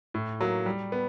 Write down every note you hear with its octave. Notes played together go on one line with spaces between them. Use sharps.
A2
F#3 A#3
G3
B3